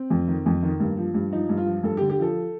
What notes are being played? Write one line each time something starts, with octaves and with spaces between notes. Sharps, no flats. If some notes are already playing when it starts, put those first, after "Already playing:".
Already playing: C4
F2
D#3
F2
D#3
G2 A#3
F3
G2
F3 D#4
G2
F4
F3
G2 A4
G4
D3
G4
F3 A4